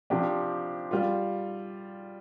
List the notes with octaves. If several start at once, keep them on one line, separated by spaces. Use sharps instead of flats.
C3 F3 D4 G4
G3 F4